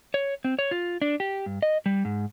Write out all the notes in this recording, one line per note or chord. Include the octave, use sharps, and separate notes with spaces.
C#5
C4
C#5
F4
D4
G4
G2
D#5
G3
G#2